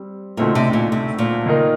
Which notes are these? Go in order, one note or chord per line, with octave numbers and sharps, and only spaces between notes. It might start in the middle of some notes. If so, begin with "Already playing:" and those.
Already playing: G3 C4
D2 A#2 D3 A3 C4 D#4
C3
A#2
C3
A#2
D#3 A#3 D#4 A#4